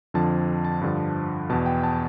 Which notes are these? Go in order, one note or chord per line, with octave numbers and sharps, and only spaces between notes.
F2 D3 F3 A5
A5
G2 D3 F3
E2 B2 A5
G5
A5